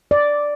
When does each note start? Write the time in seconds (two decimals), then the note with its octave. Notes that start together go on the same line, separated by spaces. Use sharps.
0.11 D5